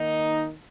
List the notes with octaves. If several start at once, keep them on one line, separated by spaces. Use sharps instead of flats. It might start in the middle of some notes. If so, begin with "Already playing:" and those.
Already playing: D#3 A#3 D#4